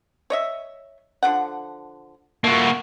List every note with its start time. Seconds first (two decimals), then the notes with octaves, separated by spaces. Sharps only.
0.30 C#5 D#5 E5
1.23 D3 F3 F#5
2.44 A3 A#3 F4 F#4